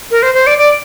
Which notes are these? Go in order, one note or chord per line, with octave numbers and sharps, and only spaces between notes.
A#4
C5
C5
D5
D5